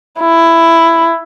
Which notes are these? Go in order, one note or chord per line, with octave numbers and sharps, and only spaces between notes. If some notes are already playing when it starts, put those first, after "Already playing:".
E4